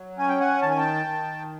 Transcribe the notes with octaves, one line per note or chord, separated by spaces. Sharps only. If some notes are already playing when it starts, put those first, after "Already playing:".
Already playing: F#3
C#4 G#5
G5
F#5 G#5
D#3 A5
G#5
G5 A5
D#3